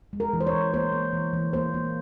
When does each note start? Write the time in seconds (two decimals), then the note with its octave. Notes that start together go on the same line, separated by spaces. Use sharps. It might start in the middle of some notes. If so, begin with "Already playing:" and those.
0.13 G#3
0.20 A#4
0.33 E3
0.41 C5
0.47 C#5
0.53 E3
0.73 A#3 C5
0.93 A#3
1.13 E3
1.33 E3
1.53 A#3 C5
1.74 A#3